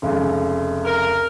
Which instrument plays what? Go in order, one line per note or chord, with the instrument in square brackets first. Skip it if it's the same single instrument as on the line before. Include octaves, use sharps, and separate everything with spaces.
[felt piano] F1 C#2
[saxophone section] A#4